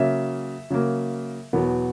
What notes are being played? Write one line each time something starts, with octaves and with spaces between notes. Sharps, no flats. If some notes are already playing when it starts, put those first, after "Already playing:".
Already playing: C#3 F#3 A#3 E5
C#3 F#3 A#3
E2 B2 F#3 B3